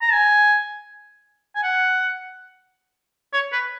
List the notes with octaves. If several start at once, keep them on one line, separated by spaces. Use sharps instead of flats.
A#5
G#5
G#5
F#5
C#5
B4